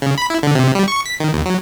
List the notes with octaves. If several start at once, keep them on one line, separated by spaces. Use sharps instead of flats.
C#3
B5
E4
D3
C3
G3
C#6
B6
D#3
D#2
F#3